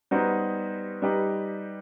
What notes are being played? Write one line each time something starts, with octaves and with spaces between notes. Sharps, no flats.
G3 B3 D#4 F#4 C5
G3 D#4 G4 B4 D#5